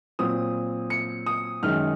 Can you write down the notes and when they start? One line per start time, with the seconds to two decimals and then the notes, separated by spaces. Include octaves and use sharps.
0.19 A#2 F#3 C4 D#6
0.90 C#7
1.26 D#6
1.63 F#2 D#3 G#3 F6